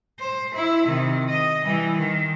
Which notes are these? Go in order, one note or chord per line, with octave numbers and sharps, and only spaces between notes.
C5
E4
C3 D#3
D#5
E3 G3
D#3